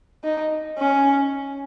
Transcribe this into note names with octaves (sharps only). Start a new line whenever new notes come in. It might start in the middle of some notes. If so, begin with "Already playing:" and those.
D#4
C#4